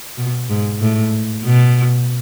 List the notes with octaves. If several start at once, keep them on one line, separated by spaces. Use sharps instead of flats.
B2
G#2
A2
B2